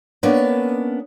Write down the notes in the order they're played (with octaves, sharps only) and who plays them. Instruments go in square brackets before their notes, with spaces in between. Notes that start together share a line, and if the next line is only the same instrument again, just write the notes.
[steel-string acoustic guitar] A#3 B3 C#4 D4 A#4 C#5